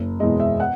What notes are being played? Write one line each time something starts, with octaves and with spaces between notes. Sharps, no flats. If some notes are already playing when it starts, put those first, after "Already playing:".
Already playing: F#1
E2 B2 G#3 D#5
E5
F#5